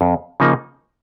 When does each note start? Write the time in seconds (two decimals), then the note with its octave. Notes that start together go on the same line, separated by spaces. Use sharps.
0.01 F2
0.40 C#3 F3 A#3 D#4